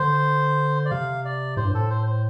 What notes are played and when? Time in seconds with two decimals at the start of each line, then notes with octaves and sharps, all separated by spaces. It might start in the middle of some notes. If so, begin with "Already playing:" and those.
Already playing: D3 C5
0.85 D5
0.91 C3 F5
1.25 D5
1.57 A2 C5
1.65 G2
1.71 A2 A4
1.90 C5
2.07 C5